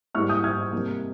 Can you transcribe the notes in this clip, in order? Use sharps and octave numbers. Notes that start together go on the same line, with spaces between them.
G#2 G3 A#3 C#6 F6
D#6 G6
F6 G#6
C3 G3 A#3